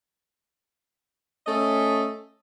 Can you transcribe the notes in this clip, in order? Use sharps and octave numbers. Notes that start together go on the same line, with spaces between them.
A3 C#4 D#5 E5